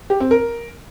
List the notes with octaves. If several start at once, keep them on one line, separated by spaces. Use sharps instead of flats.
G4
C4
A#4